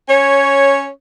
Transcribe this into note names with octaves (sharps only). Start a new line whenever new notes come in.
C#4 C#5